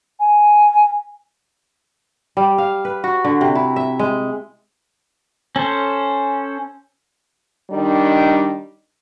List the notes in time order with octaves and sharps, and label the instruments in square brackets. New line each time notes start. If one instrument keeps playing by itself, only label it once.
[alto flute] G#5
[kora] G3
F5
B4
F#4
D3
C3
E4
E5
G#3
[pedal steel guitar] C#4 A4 C5
[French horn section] D#3 G3 D4 D#4